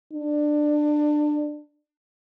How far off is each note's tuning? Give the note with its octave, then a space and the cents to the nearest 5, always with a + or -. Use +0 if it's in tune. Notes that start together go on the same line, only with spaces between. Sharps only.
D4 +20